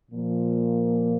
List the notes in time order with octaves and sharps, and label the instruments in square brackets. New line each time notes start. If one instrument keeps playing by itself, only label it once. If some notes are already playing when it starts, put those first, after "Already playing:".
[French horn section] A#2 F3 A#3